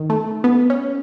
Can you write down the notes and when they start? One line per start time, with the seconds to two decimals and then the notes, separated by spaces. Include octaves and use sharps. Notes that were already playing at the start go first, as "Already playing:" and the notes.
Already playing: D#3
0.10 A3
0.44 B3
0.70 C#4